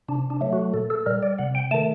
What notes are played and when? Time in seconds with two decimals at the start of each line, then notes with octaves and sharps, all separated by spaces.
0.08 C3 D4
0.30 D4
0.41 F#3 A3
0.53 F#4
0.74 A#2 A4
0.90 A4
1.06 G3 A#4
1.23 D5
1.39 C3 F#5
1.55 G5
1.71 A3 A5
1.74 D#3